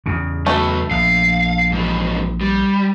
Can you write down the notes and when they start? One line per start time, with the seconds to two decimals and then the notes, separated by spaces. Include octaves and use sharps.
0.06 E2 C#3
0.46 F#3 A3 B3
0.91 A#1 F5
1.72 G#2 E3
2.41 G3